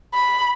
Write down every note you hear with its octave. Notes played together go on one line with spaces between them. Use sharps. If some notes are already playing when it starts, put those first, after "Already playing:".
B5